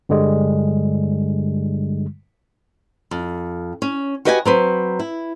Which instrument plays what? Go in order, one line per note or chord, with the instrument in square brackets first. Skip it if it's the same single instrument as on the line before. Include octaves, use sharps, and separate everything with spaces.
[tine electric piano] G2 D3 G3 G#3
[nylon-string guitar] F2
C#4
F#4 G4 B4 D#5 E5 G#5
F#3 C4 B4
E4